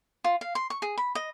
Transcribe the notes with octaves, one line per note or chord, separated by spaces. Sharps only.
F4
F5
C6
C#6
G#4
B5
D#5